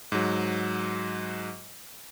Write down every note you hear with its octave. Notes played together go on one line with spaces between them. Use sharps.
G#2 F#3